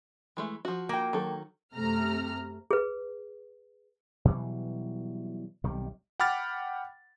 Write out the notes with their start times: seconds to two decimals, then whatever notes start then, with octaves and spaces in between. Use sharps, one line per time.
0.37 E3 G#3 A3
0.65 F3 F#4
0.89 A#3 G5
1.13 D#3 F#3 A4
1.74 F#2 C3 A3 A#5 F6
2.71 G#4 B4
4.25 B2 E3 F#3 G3
5.64 B1 C3 D#3 G3
6.20 F#5 G5 B5 D6 F6 A6